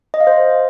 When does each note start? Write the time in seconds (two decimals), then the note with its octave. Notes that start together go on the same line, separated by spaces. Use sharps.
0.14 D#5
0.20 F5
0.27 C5